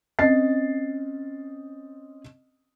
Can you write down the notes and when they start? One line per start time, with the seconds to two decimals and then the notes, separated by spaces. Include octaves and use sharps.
0.19 C4 C#4 D#5 A6 C7